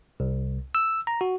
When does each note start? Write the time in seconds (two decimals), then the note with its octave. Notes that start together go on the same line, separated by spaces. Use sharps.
0.20 C2
0.75 E6
1.07 A#5
1.21 F#4